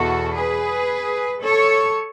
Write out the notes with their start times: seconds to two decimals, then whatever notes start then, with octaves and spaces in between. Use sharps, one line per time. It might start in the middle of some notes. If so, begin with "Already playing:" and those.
Already playing: E2 B2 F#4 A4
0.37 G#4 B4
1.43 A4 C#5